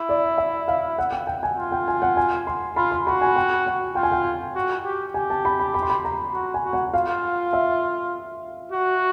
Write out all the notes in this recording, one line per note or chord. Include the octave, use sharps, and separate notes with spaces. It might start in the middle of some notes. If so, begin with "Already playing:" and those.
Already playing: E4
D5
E5
F5
F#5
G5
G5
G#5
F4
G5
G#5
F#5
G#5
C6
F4 B5
C6
F#4 B5
G#5
G5
F#5
F4 G5
G#5
G5
F#4
G4
G4 G#5
A5
B5
B5
B5
C6
B5
A#5
F#4
G#5
F#4
F#5
F4 F5
E5
F#4